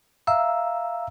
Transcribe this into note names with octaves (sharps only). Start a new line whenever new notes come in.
E5 F5 A#5 E6